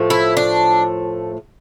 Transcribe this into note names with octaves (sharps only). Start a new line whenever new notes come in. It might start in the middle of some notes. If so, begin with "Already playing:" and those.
Already playing: A2 F3 A3
E4
D4